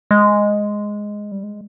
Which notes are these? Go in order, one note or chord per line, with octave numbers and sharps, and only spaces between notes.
G#3
G3
G#3